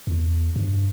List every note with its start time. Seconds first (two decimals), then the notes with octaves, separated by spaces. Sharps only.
0.07 E2
0.56 G2